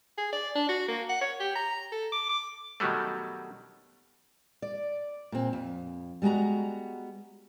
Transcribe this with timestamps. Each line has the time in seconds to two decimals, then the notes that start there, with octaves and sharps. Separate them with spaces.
0.18 G#4
0.33 D5
0.56 D4
0.69 F#4
0.89 A#3
1.09 F#5
1.22 C#5
1.40 G4
1.56 A#5
1.92 A4
2.12 D6
2.29 D6
2.80 B2 D#3 F#3 G3 A3
4.62 D5
5.32 A#2 C4
5.53 F2
6.22 G3 G#3 B3 F#4 A#5